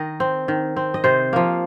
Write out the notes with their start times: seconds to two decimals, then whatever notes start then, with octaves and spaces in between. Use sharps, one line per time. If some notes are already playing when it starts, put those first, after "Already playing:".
Already playing: D#3 D#5
0.20 C4
0.48 D#3
0.77 C4
0.94 D#5
1.04 C3 C5
1.33 F3 A#3